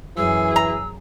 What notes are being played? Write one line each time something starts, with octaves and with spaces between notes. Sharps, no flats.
F#2 E3 G#4 E6
A#5